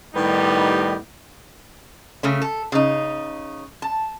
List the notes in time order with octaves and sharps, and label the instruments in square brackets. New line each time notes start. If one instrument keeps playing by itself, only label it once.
[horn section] A2 D#3 G3 B3 D#4 G4
[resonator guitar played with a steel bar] C#3 A3 C#4
A4
C#3 D#4
A5